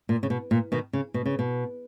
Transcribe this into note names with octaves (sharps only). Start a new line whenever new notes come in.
A#2
C#3
B2
A#2
B2 D#3
C#3
B2
C#3
B2